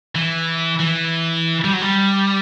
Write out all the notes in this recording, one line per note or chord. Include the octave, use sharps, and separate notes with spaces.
E3
E3
G3
F#3
G3